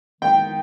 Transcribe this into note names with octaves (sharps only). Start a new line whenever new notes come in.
D#3 G#3 B3 D#4 G5